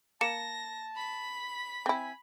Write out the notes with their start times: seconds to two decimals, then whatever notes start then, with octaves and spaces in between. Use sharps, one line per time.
0.21 A#3 A5 A#6 C#7 E7
0.96 B5 B6
1.86 C4 E4 G#5